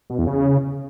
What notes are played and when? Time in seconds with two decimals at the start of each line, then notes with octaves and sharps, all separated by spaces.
0.10 B2
0.18 E2
0.27 C#3